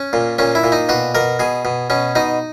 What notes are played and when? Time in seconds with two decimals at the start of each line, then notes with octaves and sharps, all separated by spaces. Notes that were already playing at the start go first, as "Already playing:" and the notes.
Already playing: C#4
0.13 A#2
0.39 A#2 C#4
0.55 E4
0.64 A#2
0.72 D#4
0.89 B2 F#4
1.15 B2 A#4
1.39 B2 G#4
1.65 B2
1.90 B2 C#4
2.15 B2 D#4